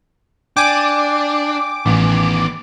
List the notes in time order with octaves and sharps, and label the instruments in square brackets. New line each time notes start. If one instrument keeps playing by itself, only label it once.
[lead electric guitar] D4 [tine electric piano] G5 G#5 [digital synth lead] D6
[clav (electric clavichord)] A1 [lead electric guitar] D#3 B3